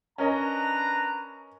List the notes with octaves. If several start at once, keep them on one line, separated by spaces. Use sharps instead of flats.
C#4 D4 A#4 B4 D#5 A#5